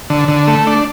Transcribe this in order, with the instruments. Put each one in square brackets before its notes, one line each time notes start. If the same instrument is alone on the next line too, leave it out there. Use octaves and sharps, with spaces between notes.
[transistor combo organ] D3
D3
A3
D4